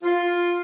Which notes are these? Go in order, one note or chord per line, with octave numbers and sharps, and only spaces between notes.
F4